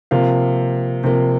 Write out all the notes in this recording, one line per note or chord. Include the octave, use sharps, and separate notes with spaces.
C3 F3 A#3 F5
C3 F3 A#3